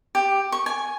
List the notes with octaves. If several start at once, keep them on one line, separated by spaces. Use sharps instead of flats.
G4
C#6
G#5